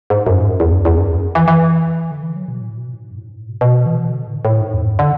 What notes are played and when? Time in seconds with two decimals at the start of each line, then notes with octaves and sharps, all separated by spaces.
0.10 G#2
0.27 F#2
0.60 E2
0.72 F#2
0.85 E2
0.98 F#2
1.35 E3
1.48 E3
2.11 D3
2.23 E3
2.36 F#3
2.48 B2
2.61 A2
2.78 B2
2.94 G#2
3.11 F#2
3.18 A2
3.24 G#2
3.36 A2
3.49 B2
3.61 B2
3.86 E3
4.11 D3
4.28 A2
4.45 A2
4.61 G#2
4.73 E2
4.86 F#2
4.99 D3